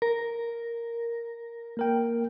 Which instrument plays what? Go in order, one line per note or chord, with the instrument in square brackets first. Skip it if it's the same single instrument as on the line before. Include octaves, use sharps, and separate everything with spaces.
[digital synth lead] A#4
[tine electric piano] A#3 A#4 G5